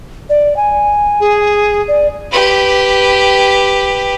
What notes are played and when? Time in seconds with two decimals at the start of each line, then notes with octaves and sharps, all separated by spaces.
0.30 D5
0.57 G#5
1.20 G#4
1.88 D5
2.31 G4 B4